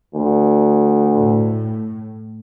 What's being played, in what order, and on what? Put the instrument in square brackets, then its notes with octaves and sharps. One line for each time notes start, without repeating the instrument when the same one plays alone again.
[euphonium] D2
[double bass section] A2